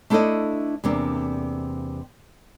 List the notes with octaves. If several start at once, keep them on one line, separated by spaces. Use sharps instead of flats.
A3 D4 E4 A4 C5 D#5
E2 C3 A#3 C4 D4